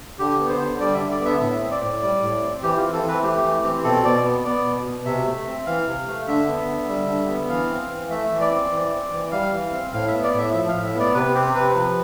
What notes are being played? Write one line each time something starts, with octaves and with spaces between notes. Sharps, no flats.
D3 G4
B3
C5
D3
G3 D5
D3 E5
D5
B3
E5
A2 E5
C4
D5
A2
G3
A2
C4
E3 G4
F4
C4
A4
E3
B4
A3 G4
E3
C4
B2 A4
B2 D5
B3
B3 D5
B2
B2
C3 E5
A3
C4
E3 F5
C3
A3
D3 E5
B3
D3
G3
D3
B3
E3 F5
C4
E3
A3 E5
E3
D5
C4
E3
C4
E3
G3 F5
E3
C4
A2 F5
B3 E5
D5
A2
E5
F3 E5
F5
A2
E5
B3 D5
C3 B4
C4 G4
C3 B4
F3